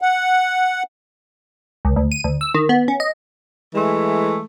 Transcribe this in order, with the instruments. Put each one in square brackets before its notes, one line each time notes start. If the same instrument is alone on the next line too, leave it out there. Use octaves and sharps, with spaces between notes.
[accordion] F#5
[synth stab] C#2
D2
D#7
D2
E6
D#3
B3
C#4
D#5
[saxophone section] E3 G#3 A3